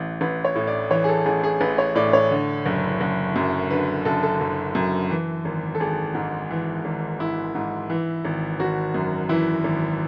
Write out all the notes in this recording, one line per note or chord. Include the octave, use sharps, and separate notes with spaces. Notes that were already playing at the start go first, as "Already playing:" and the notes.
Already playing: A1 E3
A1 B4
C#5
A2
D5
E3 C#5
G#4
A4
A1 G#4
G#4
A1 B4
C#5
A2 D5
C#5
D3
F#1
F#1
F#2
D3 B4
F#1 A4
A4
F#1
F#2
E3
G#1
A4
G#1 G#4
G#2
E3
G#1
G#1 E4
G#2
E3
G#1
G#1 F#4
F#2
E3 E4
G#1